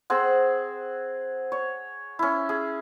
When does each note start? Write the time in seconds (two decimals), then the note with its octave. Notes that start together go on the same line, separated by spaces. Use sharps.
0.10 C4 G#4 C5 F#5
1.52 C#5
2.19 C#4 E4
2.49 G#4